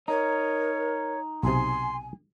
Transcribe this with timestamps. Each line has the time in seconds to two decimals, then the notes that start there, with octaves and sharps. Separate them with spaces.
0.08 D#4 A#4 C#5
1.43 B1 C3 G#5 C6